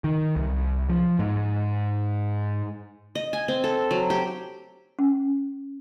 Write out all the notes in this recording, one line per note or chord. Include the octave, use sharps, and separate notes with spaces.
D#3
C2
F3
G#2
D#5
G#5
C4
A4
F#3
G4
C#4